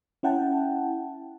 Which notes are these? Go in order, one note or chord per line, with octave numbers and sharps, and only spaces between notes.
C#4 E4 F#5 G5 A5